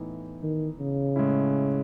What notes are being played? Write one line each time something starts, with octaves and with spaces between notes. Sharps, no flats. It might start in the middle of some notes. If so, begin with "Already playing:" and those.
Already playing: A2 E3 B3 D#4
D#3
C#3
A2 G#3 C#4 E4